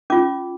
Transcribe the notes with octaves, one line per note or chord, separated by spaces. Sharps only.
C#4 F4 D6